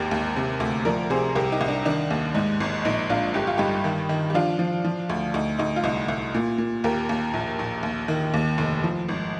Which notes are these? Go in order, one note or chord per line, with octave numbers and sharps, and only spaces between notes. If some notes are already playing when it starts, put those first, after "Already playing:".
Already playing: G#1 D#2 G4 A#4
D#2
C3
D2
F3 A#4 D5
C3 G#4 C5
C2 G4 A#4
D#4 G4
C2
D4
D#3 D4
D#2
G#2 D#4
G#1
A#1 D#4
A#1 D4 F4
G1 G4
F4
G2 D#4 G4
D#3
D#3
G4
F3 D4 F4
F3
F3
D2
D2 D#4
D2 D#4
F4
C2 D#4
C2
A#2
A#2
D#2 G4 A#4
D#2
A#1
A#1
D#2
D#3
D#2
F1
F3
G#1